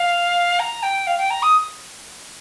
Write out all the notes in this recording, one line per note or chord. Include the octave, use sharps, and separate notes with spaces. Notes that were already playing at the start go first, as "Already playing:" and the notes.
Already playing: F5
A#5
G5
F5
G5
A#5
D#6